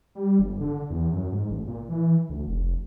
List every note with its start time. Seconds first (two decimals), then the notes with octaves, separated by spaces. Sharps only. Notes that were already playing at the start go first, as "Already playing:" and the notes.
0.15 G3
0.39 G1
0.61 D3
0.90 E2
1.12 F#2
1.32 G#2
1.50 A1
1.67 A#2
1.89 E3
2.29 D2
2.47 F1